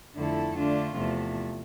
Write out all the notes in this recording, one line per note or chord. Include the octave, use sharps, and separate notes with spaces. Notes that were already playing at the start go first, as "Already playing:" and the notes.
F2 D3 A3 E4 A4
D3 A3 D4 F4
E2 C3 F3 A3